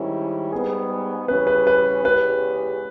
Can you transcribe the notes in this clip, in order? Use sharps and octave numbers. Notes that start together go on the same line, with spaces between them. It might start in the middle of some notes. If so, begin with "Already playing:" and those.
Already playing: G#2 D#3 G3 C#4 E4
G#2 G3 B3 G#4
C#3 E3 G3 C#4 B4
B4
B4
E2 C#3 G#3 C#4 G4 B4